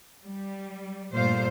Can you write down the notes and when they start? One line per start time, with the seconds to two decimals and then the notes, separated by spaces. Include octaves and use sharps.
0.25 G3
1.13 G2 A#2 G3 A3 C5 F5